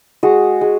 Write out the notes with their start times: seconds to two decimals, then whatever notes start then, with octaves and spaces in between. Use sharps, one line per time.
0.23 G#3 F#4
0.61 G#3